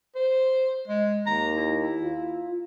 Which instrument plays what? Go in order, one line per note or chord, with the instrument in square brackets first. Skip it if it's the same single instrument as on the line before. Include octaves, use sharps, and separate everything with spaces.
[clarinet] C5
G#3
[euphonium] D#2 [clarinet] A#5
[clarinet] E4
[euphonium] F4